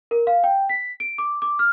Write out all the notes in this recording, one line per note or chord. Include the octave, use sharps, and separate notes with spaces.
A#4
F5
G5
B6
D7
D6
D6
F6